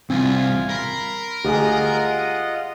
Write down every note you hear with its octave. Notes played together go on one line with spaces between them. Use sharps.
C2 C4 F4 G#5
A#4 B5 C6
D2 F4 G4 G#4 D#5 F#5